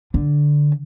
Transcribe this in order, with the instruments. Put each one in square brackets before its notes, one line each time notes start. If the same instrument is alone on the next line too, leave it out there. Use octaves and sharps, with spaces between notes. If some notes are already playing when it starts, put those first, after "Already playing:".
[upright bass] D3